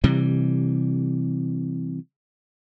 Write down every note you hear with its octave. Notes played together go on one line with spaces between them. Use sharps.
C3 E3 G3